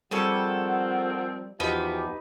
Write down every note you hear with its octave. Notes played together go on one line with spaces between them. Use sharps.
D#3 F3 G3 C4 G#4 A4 C#5 F#5
E2 F3 D#4 F#4 G4 B4 B5